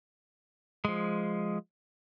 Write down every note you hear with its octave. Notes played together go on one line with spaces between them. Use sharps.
F3 G#3